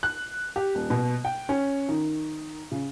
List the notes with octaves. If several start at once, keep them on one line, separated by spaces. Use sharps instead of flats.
F#6
G4
D#1
B2
G5
C#4
D#3
C#3